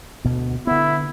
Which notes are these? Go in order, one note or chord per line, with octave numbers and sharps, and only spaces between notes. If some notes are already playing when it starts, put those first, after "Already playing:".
D2 B2
D3 B3 E4